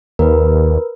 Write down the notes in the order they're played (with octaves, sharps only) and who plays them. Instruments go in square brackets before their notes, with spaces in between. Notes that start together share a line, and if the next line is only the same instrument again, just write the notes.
[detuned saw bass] D#2 [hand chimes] A#4 B4